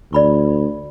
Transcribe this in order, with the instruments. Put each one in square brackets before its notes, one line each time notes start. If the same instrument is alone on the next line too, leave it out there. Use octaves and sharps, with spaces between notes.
[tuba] D2 [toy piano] D5 B5 C#6